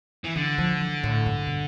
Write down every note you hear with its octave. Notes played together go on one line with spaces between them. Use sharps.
E3
D3 E3
F3
E3
A2
G2
B2